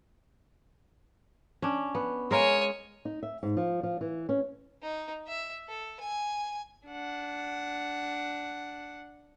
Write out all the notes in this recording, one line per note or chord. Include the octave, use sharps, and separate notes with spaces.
C#4 D4
B3
G#3 A#4 C#5 F5 G#5
D#4
E5
G#2
F3
F3
E3
C#4
D#4
E5
A4
G#5
D4 F#5